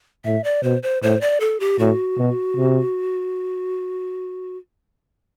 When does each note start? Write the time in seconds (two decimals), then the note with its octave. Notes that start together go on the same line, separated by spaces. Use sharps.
0.25 A2 E5
0.44 D5
0.63 B2 C5
0.83 C5
1.03 A2 C5
1.21 D5
1.40 A4
1.60 G4
1.79 A2 F#4
2.18 B2
2.57 C3